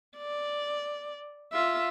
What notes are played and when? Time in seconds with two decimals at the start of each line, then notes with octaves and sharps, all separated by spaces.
0.18 D5
1.53 F4 E5